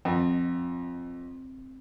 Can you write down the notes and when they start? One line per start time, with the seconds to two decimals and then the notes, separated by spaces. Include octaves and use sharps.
0.05 F2 C4 D#5 F#5